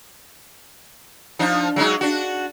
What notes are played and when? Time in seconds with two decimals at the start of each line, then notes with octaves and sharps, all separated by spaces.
1.39 F3 D4 D#4
1.76 F#3 G#3 D#4
2.01 D4 F#4